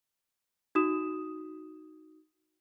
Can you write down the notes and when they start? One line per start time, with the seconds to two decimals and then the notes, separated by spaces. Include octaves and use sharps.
0.75 D#4 F#4 D#6 E7